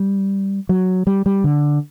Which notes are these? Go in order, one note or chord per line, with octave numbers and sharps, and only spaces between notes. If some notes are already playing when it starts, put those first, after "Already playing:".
Already playing: G3
F#3
G3
G3
D3